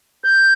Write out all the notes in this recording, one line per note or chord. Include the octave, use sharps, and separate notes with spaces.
G6